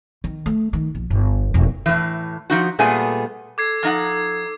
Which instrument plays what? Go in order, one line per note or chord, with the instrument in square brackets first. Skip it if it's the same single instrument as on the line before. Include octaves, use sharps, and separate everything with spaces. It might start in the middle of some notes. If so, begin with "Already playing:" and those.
[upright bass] D#3
A3
D#3
A#1
G1
E1
[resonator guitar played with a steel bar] A2 E3
F3 D#4 F#4
A#2 G3 A3 B3 G#4 G#5
[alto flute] A4 [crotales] D6 G#6 C7
[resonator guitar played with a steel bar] F3 D#4 F#5